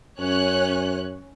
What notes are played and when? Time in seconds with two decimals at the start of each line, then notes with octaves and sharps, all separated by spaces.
0.20 F#2 C#4 C#5 F#6